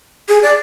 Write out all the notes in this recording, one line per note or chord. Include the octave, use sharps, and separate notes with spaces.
G#4
D5